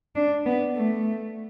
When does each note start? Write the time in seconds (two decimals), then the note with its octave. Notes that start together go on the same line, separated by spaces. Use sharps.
0.16 D4
0.46 B3
0.76 A3